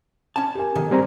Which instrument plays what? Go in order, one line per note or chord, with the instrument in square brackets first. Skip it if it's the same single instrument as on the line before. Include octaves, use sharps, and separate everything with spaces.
[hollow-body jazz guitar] C#4 A5
[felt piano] G4 A#4 G#5
[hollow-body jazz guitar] B1 G#2 D#3
[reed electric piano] G3 C4 A#5